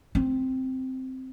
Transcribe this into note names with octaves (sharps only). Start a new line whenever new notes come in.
C4